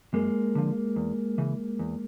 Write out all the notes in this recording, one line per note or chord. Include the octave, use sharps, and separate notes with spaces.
F#2 G#3 A#3
D3 F3
E2
C#3 E3
E2